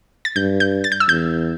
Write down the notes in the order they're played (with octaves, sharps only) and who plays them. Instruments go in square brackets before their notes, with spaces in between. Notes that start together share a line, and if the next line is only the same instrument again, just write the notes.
[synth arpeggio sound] A6
[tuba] G2 [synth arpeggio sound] G6
[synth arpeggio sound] G6
A6
G6
E6
[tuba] E2 [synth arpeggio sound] G6